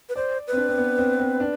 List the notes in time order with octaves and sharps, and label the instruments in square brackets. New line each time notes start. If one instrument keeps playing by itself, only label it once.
[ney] B4
[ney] C5 [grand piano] D5
[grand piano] C4 [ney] B4
[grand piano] D4
C4
B3
C4
C4
D4